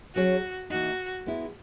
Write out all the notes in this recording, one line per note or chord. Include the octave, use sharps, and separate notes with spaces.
F#3 C#4 F#4 G#4 C#5
E3 A#3 D#4 F#4
G#3 B3 E4